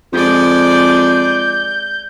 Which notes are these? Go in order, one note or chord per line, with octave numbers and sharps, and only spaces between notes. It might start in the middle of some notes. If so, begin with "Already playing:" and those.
F2 G#3 D5 G6